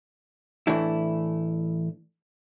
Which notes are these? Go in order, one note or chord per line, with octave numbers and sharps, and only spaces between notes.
A2 E3 A3 D4 E4